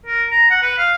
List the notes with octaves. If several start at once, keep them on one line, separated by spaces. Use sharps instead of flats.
A#4
A#5
F#5
B4
F5